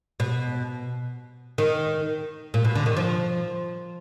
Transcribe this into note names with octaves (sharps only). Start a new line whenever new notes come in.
B2
D#3
A#2
B2
D3
D#3
F3